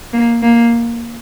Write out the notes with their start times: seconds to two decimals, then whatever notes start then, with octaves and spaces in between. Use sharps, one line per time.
0.13 A#3
0.42 A#3